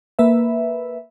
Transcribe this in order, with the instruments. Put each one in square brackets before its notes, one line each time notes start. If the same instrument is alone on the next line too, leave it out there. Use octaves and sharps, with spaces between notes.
[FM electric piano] A#3 B4 E5